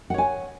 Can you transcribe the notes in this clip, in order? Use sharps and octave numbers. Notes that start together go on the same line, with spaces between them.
C#5 F#5 G#5